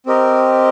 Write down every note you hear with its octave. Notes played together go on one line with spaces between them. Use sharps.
C4 G4 A#4 D#5